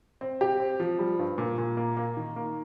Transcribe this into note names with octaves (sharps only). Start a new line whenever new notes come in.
C4
G4
C4
F3
G3
G2
A#2
A#2
A#3
A#3
D#3
A#3